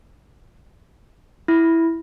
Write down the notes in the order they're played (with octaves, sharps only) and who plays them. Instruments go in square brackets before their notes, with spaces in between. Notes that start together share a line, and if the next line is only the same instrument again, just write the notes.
[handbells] E4